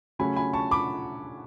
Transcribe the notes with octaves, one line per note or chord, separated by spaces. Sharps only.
C#3 F#3 A3 C#4 G#5 B5
G#5 B5
A5 C#6
B5 D6